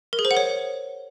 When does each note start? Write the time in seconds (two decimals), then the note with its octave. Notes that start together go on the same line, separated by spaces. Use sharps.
0.13 A#4
0.19 G#4
0.25 C5
0.31 F#5
0.37 C#5